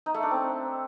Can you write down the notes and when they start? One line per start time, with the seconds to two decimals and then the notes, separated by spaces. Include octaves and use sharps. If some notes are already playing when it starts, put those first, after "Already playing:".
0.06 D#4
0.14 A3
0.23 D4
0.31 C4